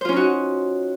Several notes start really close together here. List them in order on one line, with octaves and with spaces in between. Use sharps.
C5 F4 C#4 D#4 F#4